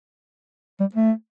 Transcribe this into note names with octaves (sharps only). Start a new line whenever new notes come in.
G3
A3